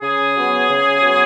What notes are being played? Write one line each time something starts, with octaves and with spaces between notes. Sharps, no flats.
C#3 G#4
F#3 B3
C#3
F#3 B3